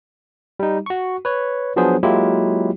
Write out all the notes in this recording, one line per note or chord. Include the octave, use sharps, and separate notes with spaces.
G3 D#4
F#4 C#6
B4 C#5
F3 F#3 B3 D4 G#4 C5
F#3 G#3 A#3 E4 F4 G4